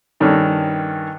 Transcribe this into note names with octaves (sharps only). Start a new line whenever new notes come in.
G2 D#3 C#4 A4